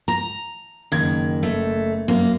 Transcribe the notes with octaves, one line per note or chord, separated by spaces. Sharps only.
A#5
F#1 D#3 G#6
A3
F#2 A#3